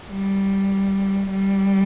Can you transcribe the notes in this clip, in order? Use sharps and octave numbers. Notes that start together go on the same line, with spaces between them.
G3
G3